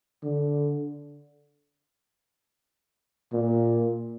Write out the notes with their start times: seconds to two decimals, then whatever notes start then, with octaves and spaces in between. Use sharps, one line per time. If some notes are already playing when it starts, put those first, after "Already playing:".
0.23 D3
3.33 A#2